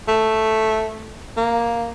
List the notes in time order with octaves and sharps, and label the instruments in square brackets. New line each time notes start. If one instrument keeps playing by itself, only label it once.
[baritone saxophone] A3
A#3